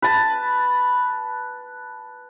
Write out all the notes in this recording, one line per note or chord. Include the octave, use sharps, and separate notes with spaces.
B4 A5